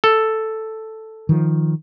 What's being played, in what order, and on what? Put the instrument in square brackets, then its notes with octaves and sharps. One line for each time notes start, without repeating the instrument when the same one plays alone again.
[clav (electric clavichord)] A4
[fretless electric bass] D#3 F3